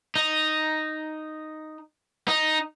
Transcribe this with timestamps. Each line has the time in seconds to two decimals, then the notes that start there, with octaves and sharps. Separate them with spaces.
0.16 D#4
2.28 D#4